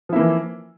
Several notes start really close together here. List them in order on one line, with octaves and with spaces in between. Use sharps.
F3 E4 A#3 E3